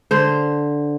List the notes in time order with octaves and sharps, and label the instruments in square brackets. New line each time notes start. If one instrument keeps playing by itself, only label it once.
[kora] D3 C5